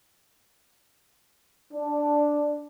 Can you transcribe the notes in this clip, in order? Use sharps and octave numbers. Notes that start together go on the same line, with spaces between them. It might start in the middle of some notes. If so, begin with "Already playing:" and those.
D4